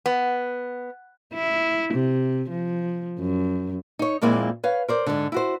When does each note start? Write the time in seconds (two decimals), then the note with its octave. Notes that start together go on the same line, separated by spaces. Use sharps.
0.06 B3
1.34 E4
1.94 C3
2.50 F3
3.19 F#2
3.99 D#4 C#5
4.21 F2 A#2 G#3 A#3 C4 E4
4.64 B4 C#5 F5
4.88 A#4 C5 D5
5.06 G#2 D3
5.32 E4 F#4 C5